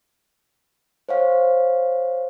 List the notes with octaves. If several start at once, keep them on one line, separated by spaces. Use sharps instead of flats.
C5 C#5 F5